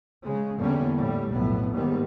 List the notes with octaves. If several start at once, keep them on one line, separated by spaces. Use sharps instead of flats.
C#3 G#3
E2 D3 G3 A#3 C#4
A2 G3
B1 F2 A2 B3
D#2 G#2 D#3 G3 B3